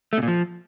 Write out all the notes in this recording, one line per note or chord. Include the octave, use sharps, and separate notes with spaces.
A3
B2
A#2
F3